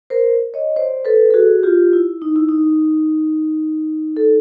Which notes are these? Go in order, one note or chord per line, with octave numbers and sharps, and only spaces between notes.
A#4 C5
C#5 D#5
C5 D5
A4 B4
A4
F#4 G#4
F4 G4
E4
D#4
E4
D#4
A4